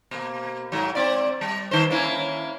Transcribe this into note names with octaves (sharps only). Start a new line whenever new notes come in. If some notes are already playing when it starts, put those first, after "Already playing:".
B2 A#3
G#2 F#3
C4 D5
G3
D#3 D#4 C5
A#3 C#4 E4